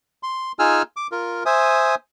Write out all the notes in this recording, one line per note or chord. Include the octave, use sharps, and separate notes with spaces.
C6
D#4 F4 G#4 G#5 E6 F6
D6
F4 A#4
C5 E5 G#5 D#6